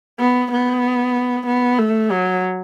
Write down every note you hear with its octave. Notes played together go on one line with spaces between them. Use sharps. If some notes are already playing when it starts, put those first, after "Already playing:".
B3
B3
B3
A3
F#3